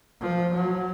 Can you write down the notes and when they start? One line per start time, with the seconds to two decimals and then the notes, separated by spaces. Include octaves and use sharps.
0.21 F3
0.53 F#3